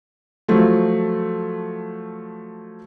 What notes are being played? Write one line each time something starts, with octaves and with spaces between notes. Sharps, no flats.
F3 F#3 A3